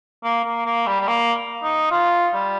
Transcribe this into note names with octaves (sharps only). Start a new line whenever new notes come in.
A#3
A#3
A#3
G3
G3
A#3
D#4
F4
G3